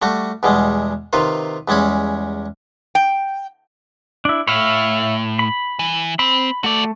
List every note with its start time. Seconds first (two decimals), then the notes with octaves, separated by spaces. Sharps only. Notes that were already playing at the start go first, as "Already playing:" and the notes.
0.02 G3 A3 F#4
0.43 E2 B2 G3 G#3
1.13 C3 D#3 F4 B4
1.68 E2 G3 G#3 C#4 B5
2.95 G5
4.25 D4 E4
4.47 A2 C#5 E5 F5
5.39 B5
5.79 E3
6.19 C4 B5
6.64 A3 F#4 D5